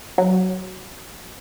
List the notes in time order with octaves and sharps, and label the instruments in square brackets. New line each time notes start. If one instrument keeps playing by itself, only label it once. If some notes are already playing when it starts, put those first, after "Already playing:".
[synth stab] F#3